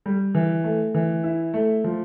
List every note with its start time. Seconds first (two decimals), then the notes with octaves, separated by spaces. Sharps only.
0.06 G3
0.34 E3
0.64 A3
0.94 E3
1.23 E4
1.54 A3
1.84 F3